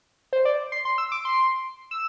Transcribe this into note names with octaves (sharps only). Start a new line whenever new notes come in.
C5
D5
C6
C6
E6
D6
C6
E6